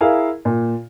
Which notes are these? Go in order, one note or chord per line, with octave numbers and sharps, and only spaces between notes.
E4 G#4 A#4 F5
A#2